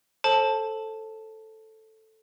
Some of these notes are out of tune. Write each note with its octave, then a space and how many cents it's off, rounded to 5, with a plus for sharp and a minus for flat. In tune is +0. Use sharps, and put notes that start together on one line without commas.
A4 +0 C5 +30 A5 +0